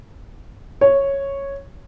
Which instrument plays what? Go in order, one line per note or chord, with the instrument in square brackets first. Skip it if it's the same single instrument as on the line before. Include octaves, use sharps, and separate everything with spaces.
[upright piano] C#5